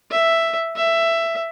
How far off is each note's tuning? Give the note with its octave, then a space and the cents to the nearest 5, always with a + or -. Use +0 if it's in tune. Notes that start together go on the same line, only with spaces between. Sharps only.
E5 +5
E5 +10